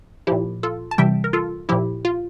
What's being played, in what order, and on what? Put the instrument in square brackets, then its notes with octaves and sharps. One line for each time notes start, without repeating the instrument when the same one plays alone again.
[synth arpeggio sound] A#2 F3 E4 G4
F4 A4
A5
C3 E3 G3 E5 G5
A#4
F4 A4
A#2 F3 E4 G4
F4